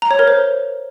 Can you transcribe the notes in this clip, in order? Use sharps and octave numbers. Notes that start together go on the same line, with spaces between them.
A#5
C#5
A#4
C5